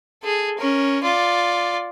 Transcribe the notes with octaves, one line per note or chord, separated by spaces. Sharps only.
G#4 A4
C#4 A#4
F4 D5